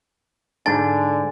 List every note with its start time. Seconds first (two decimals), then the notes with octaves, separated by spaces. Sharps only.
0.66 G#2 D3 D4 G#5 A6